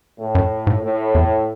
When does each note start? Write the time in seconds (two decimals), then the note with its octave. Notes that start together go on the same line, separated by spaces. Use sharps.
0.18 A2
0.35 F#2
0.67 G#2
0.83 A2
1.15 E2